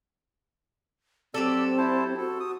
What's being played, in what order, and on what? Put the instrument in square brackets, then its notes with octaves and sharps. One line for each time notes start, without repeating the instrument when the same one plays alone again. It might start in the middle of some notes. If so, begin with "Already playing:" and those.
[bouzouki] F#3 G4 A4 [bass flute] C4 [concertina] D5 A5 E6
[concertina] E4 C5 A5
[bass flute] F#4 [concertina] A4
[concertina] D#6